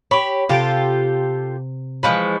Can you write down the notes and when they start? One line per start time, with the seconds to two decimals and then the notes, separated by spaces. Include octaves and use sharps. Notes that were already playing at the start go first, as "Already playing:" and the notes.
0.11 G4 C#5 B5
0.49 C3 F4 G4 A4 D7
2.03 E3 F3 G#3 B5 C#6